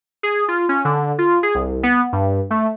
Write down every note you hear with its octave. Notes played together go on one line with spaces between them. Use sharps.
G#4
F4
C#4
D3
F4
G#4
C2
B3
G2
A3